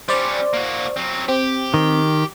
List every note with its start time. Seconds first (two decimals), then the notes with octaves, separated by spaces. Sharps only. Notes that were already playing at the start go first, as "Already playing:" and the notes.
0.09 G3 C#4 C5 D5
0.53 A#3 F#4
0.97 F#3 C4
1.28 C4 G4
1.74 D#3